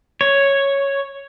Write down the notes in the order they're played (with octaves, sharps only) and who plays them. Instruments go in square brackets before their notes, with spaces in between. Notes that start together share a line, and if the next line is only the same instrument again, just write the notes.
[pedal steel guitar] C#5